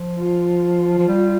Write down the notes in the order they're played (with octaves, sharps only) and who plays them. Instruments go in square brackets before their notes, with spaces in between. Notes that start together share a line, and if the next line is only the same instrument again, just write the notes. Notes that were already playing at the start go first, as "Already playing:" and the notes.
Already playing: [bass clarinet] F3
[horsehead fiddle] F4
[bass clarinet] F3
G3